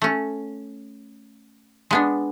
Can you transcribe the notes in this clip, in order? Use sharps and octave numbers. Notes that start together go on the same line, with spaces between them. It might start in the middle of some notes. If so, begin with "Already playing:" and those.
A3 C#4
G#3 B3 D4